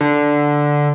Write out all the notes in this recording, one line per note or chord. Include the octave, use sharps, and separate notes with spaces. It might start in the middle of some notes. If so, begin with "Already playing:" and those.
D3